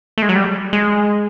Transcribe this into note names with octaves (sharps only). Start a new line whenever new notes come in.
A3
G#3
F#3
G3
G#3